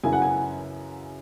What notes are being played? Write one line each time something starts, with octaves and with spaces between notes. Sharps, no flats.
F#2 C#3 E3 G#5
F#5
G#5